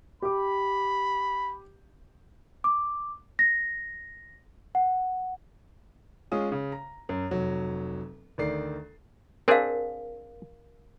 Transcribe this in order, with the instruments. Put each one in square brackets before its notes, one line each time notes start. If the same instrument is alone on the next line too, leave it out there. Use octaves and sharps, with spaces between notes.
[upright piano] G4 D6 [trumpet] B5
[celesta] D6
A#6
F#5
[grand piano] G#3 C#4 F4 D#6
C#3
A#5
F#2
F1 F#3 F#4
D2 D#3 D5 C7
[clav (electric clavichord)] C4 D4 G#4 [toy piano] A#4 F5